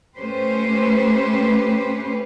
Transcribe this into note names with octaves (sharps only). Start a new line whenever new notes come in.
A3 C#4 G4 B4 C5